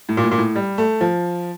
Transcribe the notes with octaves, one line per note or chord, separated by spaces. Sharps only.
A2
A#2
A2
A#2
A2
G3
A3
F3